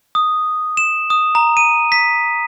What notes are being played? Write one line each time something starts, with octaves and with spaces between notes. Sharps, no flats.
D#6
E7
D#6
A#5
D#7
B6